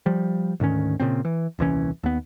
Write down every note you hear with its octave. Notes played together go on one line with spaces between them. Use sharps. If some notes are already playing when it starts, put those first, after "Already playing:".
F3 G3
D2 G#2 D#3 C#4
A#2 C#3 C4
E3
D#1 C2 E3 C#4
D#2 B3